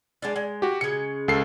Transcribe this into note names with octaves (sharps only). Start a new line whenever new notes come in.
G#3 D4 D5
G#3
F#4 G4
C#3 G#3 C#7
C#2 A4 C7